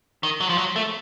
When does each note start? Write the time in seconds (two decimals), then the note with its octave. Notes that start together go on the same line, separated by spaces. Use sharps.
0.23 D#3
0.40 F#3
0.49 F3
0.58 F#3
0.76 A3